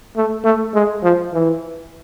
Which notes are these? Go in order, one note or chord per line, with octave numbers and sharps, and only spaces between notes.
A3
A3
G#3
F3
E3